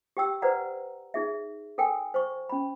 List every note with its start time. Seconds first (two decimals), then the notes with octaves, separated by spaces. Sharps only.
0.17 G4 G5 E6
0.42 B4 C5 D5 F#5 A#5
1.14 D#4 G#4 E5
1.78 A4 A#4 G5 G#5
2.14 C5 C#6
2.49 C#4 B5